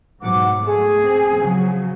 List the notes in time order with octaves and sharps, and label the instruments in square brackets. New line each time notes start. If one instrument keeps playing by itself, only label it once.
[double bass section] G#2 B2 F#3 [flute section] F#5 D6
[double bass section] A3 [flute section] G#4
[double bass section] C4
C#3 F3 F#3